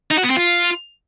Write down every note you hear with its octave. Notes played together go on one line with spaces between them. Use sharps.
D#4
F#4
B3
C4
F4